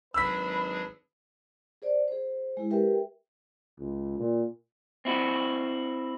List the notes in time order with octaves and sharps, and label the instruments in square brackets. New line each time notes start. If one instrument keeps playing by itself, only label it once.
[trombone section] G#1 B4 [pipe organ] F#3 D4 G#4 [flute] B5 [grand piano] E6 B6
[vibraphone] G#4 C5 D5
G#4 C5
G#3 E4 G#4
G4 A#4 B4 E5 G5
[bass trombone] C#2
A#2
[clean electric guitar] C4 E4 F#4